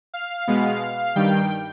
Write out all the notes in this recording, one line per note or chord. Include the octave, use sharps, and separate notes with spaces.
F5
B2 G#3 B3
G2 D#3 G3 G5